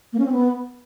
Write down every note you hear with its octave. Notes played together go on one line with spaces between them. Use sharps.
A#3
C#4
C4
B3